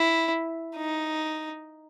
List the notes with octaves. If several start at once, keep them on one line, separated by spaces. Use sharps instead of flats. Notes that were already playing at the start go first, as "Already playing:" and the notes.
Already playing: E4
D#4